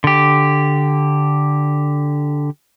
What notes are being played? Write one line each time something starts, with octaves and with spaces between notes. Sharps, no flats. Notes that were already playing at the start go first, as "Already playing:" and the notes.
D3 G4